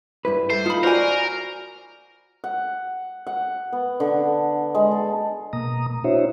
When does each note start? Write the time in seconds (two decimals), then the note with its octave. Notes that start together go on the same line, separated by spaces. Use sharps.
0.25 G2 E4 B4
0.50 A4 C5 E5
0.66 D#4 F4 B5
0.84 F#4 A#4 C5 D5 G#5
2.44 F#5
3.27 F#5
3.73 B3
4.00 D3
4.75 G#3
4.91 A4
5.53 B2 A#3 A#5 D#6
6.04 D4 E4 F#4 C5 C#5 E5